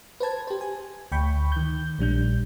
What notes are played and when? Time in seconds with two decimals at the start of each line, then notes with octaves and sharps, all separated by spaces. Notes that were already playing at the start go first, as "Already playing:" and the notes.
0.20 B4 C5 A5 G#6
0.47 G4 C5
0.61 G#5
1.12 D2 G5 B5 C#6 G6
1.52 D#3 G6
1.99 A#1 G3 D4 G6